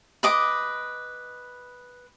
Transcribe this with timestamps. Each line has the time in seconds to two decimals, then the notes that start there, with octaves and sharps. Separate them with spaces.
0.23 B4 D#5 D6